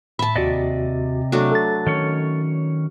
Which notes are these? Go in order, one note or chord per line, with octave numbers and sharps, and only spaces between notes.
A2 E5 A5 B5
D#2 C3 F#4 D5 D#5
F#3 A3 D4
A4 A6
D#3 C#4 C#5